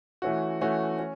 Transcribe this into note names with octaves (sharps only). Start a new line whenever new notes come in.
E3 A3 C#4 F#4
E3 A3 C#4 F#4
C#4